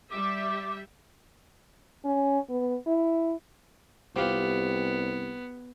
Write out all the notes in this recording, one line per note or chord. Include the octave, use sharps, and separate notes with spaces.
G3 G4 E5 D6
C#4
B3
E4
C2 B3 C4 F4 G4